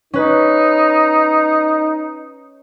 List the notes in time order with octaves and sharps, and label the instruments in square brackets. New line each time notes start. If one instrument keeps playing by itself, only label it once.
[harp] C#4 B4 [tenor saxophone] D#4